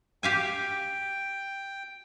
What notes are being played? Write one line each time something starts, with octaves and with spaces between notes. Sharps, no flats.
G4 F5 G5 G#5